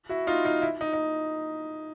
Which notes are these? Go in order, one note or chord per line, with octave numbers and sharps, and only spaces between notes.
E4 F#4
D#4 F4
D#4 F4
E4
D#4
D#4